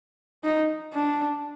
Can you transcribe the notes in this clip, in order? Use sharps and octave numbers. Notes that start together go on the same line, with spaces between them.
D#4
D4